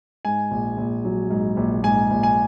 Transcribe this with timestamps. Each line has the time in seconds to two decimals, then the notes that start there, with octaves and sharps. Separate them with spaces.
0.25 G#2 G#5
0.51 A#1
0.78 A#1
1.05 F#3
1.31 G#2
1.57 A#1
1.83 G#2 G#5
2.10 A#1
2.23 G#5